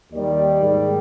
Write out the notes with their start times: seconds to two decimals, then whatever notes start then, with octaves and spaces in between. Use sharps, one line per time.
0.12 D#2 D#3 G3 D5
0.62 G#2 D#3 G3